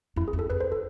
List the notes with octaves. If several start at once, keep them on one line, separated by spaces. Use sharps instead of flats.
F2 E4
G#4
F2
A4
F2 B4
C5
A4